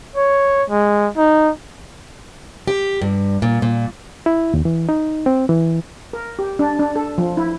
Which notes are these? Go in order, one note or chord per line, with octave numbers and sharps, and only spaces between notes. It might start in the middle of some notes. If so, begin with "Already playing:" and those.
C#5
G#3
D#4
G4
G2
A#2
A#2
E4
D#2
E3
D#4
C4
E3
A#4
G4
D4
D4
A4
F3
E4